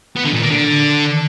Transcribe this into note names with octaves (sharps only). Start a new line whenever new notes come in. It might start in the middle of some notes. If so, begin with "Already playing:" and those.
B3
D3
A#2
A#3
D3